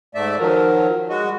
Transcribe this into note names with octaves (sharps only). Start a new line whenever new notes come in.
G#2 A3 D5 E5
D#3 F3 F#3 A#4
G#3 F#4 D#5
G3